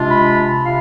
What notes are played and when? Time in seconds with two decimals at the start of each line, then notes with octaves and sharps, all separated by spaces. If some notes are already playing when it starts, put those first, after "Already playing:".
Already playing: C3 G#3 D4 F4
0.09 B5
0.65 C3 F4 F5